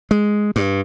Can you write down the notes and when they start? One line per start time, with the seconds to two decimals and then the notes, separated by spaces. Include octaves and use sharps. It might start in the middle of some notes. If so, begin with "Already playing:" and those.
0.11 G#3
0.56 G2